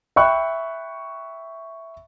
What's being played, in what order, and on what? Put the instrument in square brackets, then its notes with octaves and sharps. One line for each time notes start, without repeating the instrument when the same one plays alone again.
[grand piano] E5 G5 B5 C#6 F#6